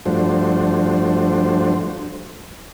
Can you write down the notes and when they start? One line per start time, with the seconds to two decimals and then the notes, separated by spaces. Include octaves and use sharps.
0.06 G2 F3 A3 D4 F#4 C5